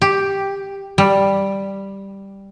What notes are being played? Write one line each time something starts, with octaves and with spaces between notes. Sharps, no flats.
G4
G3